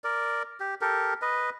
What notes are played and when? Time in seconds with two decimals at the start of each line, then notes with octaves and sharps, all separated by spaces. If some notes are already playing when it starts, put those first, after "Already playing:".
0.04 A#4 D5
0.60 G4
0.81 G4 A4 A#4
1.22 B4 D#5